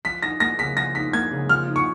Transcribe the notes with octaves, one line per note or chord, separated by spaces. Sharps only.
F3 B6
D#4 A#6
A#3 A#6
C#3 B6
F3 A#6
D#4 B6
A#3 G#6
C#3
F3 F6
D#4
C#6